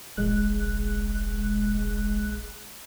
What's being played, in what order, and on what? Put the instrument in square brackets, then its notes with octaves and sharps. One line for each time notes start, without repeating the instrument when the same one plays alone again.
[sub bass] E1 [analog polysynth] A#1 G#3 F#6